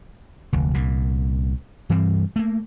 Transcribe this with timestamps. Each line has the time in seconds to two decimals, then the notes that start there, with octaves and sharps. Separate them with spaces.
0.53 F1 D2
0.74 C2 A#2
1.90 G2 E3 G3 C4
2.36 A3 A#3